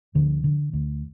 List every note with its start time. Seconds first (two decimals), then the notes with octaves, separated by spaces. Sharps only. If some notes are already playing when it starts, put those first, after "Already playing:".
0.15 D2 D3 F3
0.44 D3
0.73 D2